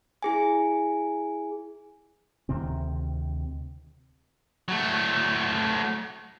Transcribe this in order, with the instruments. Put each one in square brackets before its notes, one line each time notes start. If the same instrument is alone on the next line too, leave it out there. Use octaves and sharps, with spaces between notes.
[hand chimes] E4 G#4 G#5
[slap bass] D2 C3 D#3 C4
[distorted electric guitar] F#3 A3